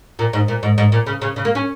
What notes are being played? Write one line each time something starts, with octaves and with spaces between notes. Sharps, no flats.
A#2
G#2
A#2
G#2
G#2
A#2
C#3
C#3
C#3
A#3
C#4